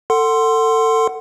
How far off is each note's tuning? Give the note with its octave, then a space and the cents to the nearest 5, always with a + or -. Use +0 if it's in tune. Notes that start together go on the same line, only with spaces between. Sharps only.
A4 +25 F#5 +10 C6 +0